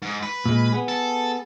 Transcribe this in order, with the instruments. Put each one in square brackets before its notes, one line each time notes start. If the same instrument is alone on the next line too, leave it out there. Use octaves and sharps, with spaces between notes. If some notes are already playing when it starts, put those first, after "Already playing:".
[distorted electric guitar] G#2
B4
[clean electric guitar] A#2 G#3
B3 G#4
[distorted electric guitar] A4